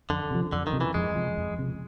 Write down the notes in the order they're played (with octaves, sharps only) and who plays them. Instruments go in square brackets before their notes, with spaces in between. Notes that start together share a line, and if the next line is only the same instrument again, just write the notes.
[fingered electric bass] F2 [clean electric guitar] D3
[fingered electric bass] C3 F3
[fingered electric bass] F2 [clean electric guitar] D3
[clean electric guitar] D#3
[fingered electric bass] C3 F3
[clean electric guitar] E3
[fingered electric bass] F2 [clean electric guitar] G#3
[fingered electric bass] C3 F3
F2
C3 F3